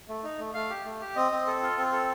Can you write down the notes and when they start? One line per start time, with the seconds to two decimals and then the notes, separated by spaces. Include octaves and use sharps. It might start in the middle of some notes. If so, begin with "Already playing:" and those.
0.09 A3
0.24 D#4
0.39 A3
0.54 A3 F5
0.70 G4
0.85 A3
1.01 G4
1.16 C4 D#5
1.32 C4
1.47 A4
1.63 F4
1.77 C4
1.92 A4